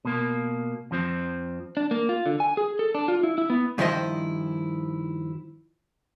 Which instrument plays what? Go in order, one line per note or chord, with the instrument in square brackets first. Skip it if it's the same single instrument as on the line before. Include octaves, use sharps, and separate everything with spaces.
[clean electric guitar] B2 A#3
F2 F3 C4
[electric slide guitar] D4
A#3
F4
D3
G#5
G#4
A4
D4
F4
E4
E4
B3
[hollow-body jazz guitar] G2 D#3 F3 E4 C5 D#5